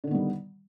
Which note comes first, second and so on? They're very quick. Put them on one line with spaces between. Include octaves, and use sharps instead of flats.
D3 D#3 B3 G3